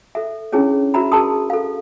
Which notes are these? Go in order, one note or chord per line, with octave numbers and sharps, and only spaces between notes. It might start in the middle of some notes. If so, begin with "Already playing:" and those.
A4 E5
C#4 D4 E4 G#4 C5 C#5
F#4 C5 E5 A#5 B5
G#4 A#4 A5 C6 D#6
A4 F5